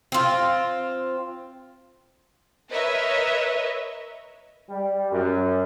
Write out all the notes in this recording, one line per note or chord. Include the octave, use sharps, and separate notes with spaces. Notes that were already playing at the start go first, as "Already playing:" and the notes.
C4 F4
A#4 B4 C#5 D#5 E5
G3
F#2